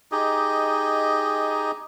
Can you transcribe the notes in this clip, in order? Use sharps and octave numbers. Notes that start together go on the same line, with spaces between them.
D#4 G4 G#4 D#5